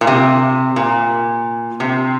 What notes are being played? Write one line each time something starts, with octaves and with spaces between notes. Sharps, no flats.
A#2
C3
A#2
C3